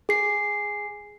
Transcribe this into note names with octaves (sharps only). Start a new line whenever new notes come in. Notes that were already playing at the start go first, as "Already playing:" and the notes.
G#4 C7